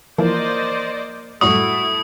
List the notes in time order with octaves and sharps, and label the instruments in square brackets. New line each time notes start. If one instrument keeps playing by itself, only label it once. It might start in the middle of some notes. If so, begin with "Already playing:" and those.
[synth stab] E3 F3 [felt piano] A#3 [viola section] C5 D5 D#5
[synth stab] F#2 A2 G3 [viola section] A3 E4 [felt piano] F#4 C#6 [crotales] D#6